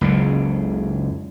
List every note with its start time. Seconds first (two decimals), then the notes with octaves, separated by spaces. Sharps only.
0.01 F#1 C#2 C#3